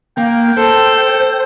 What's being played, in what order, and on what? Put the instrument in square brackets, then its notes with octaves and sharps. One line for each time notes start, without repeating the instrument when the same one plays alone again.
[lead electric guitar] A#3 [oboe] G5
[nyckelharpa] A4 [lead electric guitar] C5